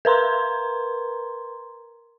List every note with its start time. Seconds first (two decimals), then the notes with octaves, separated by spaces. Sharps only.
0.05 A#4 B4 A#5 C6